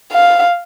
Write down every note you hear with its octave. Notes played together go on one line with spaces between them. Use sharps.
F5